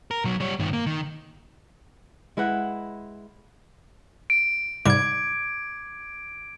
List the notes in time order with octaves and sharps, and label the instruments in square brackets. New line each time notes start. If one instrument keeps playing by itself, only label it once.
[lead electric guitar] A#4
B1 F#3
G3 C#5
G2 D#3
A#3
D#3
[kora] G#3 E4 B4 F#5
[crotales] D7
[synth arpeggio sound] G#2 C3 G3 [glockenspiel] D6 G#6